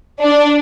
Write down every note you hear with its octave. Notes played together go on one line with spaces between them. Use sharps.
D4